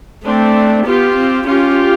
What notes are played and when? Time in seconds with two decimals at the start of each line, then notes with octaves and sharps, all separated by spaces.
0.25 A3 C4 D4
0.85 B3 F4 G4
1.17 C4
1.46 C#4 F4 G4